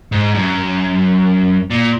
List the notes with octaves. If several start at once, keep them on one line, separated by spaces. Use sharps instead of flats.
G#2
F#2
A#2